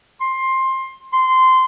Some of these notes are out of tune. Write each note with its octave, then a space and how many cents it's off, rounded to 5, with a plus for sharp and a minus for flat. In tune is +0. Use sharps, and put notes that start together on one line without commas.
C6 +15
C6 -15